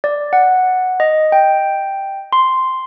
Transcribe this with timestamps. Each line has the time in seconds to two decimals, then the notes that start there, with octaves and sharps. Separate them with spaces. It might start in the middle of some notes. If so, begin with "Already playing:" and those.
0.04 D5
0.33 F#5
1.00 D#5
1.32 G5
2.33 C6